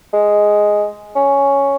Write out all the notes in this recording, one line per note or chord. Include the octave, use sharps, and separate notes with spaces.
G#3
C#4